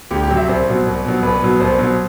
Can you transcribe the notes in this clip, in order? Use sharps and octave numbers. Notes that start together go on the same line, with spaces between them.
D2 G4
G4
C3 F#3
E5
C2 C5
B2 F#3
C2
B2 F#3
C2 B4
B2 F#3
C2 C5
B2 F#3